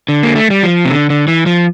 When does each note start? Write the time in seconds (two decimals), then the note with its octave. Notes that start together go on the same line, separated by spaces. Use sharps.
0.09 D3
0.23 A#3
0.36 A3
0.50 G3
0.63 F3
0.85 C3
0.91 D3
1.10 D3
1.28 E3
1.46 F3